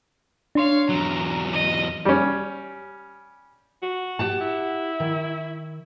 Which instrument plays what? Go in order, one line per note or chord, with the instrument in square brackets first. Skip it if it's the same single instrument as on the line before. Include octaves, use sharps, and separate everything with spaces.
[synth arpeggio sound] D4 C6 [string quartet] C#5 F5
[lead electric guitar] E2 F#3 [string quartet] A#5
[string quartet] D#5
[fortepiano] G3 C#4
[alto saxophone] F#4
[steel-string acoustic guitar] G4 F#5 A5
[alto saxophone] E4
[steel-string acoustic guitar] D#3